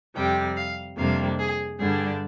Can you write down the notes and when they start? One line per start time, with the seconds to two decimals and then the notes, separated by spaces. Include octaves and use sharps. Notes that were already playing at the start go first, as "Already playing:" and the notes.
0.16 F2 C3 G3 G5
0.57 F5
0.98 F2 C3 G3 A#3 D4 F5
1.39 G#4
1.80 G2 D3 G3 D4 G#4